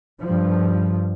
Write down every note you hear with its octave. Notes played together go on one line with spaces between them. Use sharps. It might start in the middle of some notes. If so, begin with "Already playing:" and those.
G2 F3